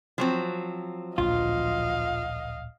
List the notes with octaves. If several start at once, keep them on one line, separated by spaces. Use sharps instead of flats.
F3 F#3 C4
D1 A#1 F4 D#5 F5